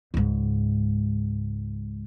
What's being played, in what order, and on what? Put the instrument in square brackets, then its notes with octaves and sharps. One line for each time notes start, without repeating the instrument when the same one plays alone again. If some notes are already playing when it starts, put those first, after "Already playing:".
[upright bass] C#2 G#2